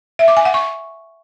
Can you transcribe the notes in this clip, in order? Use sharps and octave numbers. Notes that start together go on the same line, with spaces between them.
E5
D6
G#5
F#5
C#6